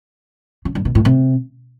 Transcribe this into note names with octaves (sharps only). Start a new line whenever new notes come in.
C#3
G2
B2
A2
C3